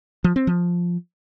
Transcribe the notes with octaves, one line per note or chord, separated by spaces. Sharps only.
F3
C4
F3